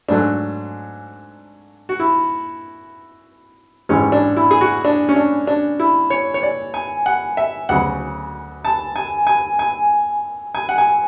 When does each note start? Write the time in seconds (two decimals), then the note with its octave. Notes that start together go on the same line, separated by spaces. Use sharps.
0.09 G#2 F#3 A3 D4
1.89 F#4
2.00 E4
3.89 A1 G#2 E3 G#3 C#4
4.12 D4
4.37 E4
4.51 G#4
4.61 F#4
4.85 D4
5.09 C#4
5.16 D4
5.47 D4
5.80 E4
6.10 C#5
6.34 C#5
6.43 D5
6.74 G#5
7.06 F#5
7.37 E5
7.69 D2 C#3 F#3 B3 F#5
8.65 A5
8.96 G#5
9.27 G#5
9.59 G#5
10.55 G#5
10.69 F#5
10.78 G#5